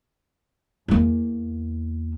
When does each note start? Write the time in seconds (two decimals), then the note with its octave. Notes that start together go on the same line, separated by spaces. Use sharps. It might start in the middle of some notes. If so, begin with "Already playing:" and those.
0.88 E2 A#3